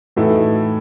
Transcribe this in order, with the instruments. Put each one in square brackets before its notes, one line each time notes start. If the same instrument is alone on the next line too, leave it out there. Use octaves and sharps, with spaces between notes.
[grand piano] A2 E3 A3 D#4 F#4